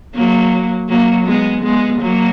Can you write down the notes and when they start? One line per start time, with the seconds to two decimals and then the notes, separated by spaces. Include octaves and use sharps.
0.15 F#3 A#3
0.89 F#3 A#3
1.26 G#3 B3
1.64 G#3 B3
2.01 F#3 A#3